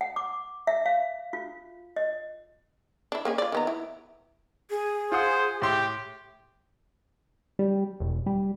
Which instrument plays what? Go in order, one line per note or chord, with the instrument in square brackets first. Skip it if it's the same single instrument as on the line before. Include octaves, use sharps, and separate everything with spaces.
[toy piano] F#5
D6
E5
F5
F4
D#5
[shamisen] D4 E4
A#3 C#4 G#4
F4 D5
D#3 B3 A#5
E4
[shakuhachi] G#4
[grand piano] F4 F#5 D#6 [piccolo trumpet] C5
[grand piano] A2 C6 [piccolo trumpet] G4
[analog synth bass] G3
E1
G3